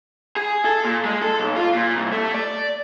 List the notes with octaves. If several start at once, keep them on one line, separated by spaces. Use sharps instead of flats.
G#4
A4
A#2
G#3
A4
B1
F4
A#2
C2
A3
D5